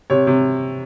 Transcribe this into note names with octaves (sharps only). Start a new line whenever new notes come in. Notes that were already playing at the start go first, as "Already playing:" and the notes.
C3 C#5
C3